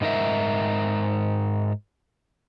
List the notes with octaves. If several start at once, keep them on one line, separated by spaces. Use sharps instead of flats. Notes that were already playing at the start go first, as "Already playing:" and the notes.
G#2 D#4 A#4 E5